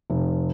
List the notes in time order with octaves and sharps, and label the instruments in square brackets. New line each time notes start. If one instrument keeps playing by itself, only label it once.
[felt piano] F1